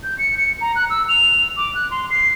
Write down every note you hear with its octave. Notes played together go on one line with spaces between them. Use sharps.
G6
C#7
C#7
A#5
F#6
E6
F7
D6
F#6
C6
C7